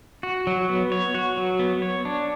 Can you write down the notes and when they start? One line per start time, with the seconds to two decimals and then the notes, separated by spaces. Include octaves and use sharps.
0.23 F#4
0.47 F#3
0.69 B3
0.92 C#5
1.15 F#4
1.37 F#3
1.59 B3
1.82 C#5
2.05 D4